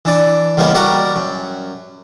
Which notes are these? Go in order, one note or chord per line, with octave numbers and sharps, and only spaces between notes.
E3 D4 D5
E2 C#3 G3 G#3 A#3 B3
G3 F#4 A#4 D5 F#5
F#2